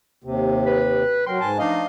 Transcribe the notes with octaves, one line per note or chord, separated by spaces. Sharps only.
D#2 C3
B4
F#3 A#4 G5 C6
G#2 G#5 A5
F3 A3 D4 D#4 D#5 F5